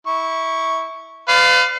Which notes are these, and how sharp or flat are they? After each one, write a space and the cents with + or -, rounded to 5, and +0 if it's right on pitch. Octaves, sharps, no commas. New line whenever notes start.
E4 -20 C#6 +0
B4 +40 D5 +0 F5 +0